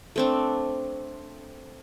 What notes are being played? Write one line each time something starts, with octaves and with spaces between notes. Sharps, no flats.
A3 C4 D4